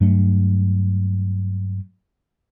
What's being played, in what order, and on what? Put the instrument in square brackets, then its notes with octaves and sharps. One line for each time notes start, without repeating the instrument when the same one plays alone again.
[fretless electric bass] G2 F#3 A3